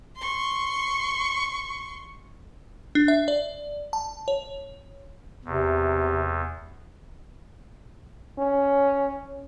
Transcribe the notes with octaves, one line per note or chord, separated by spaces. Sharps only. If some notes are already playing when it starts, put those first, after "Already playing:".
C6 C#6
D4
E5
D5
A5
C#5
E2 C3
C#4